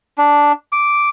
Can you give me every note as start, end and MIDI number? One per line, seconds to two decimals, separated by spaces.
0.18 0.52 62
0.72 1.09 86